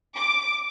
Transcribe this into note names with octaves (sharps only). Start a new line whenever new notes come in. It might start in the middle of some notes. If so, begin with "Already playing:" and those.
D6